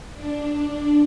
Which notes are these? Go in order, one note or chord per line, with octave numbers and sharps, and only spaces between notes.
D4